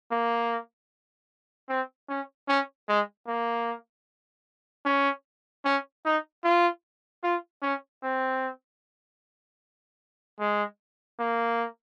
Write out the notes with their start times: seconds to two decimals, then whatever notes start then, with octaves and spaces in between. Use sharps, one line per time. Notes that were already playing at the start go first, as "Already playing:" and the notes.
0.11 A#3
1.69 C4
2.09 C#4
2.48 C#4
2.88 G#3
3.27 A#3
4.86 C#4
5.65 C#4
6.05 D#4
6.44 F4
7.24 F4
7.62 C#4
8.03 C4
10.40 G#3
11.20 A#3